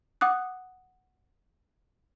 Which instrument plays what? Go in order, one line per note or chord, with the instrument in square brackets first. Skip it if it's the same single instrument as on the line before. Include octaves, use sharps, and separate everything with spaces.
[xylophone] F#5 D6 D#6 F#6